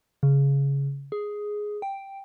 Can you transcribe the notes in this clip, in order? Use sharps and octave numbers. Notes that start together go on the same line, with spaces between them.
C#3
G#4
G5